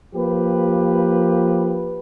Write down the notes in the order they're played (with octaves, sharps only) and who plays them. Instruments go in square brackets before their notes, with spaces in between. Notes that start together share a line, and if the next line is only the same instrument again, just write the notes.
[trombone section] F3 A#3 G4 B4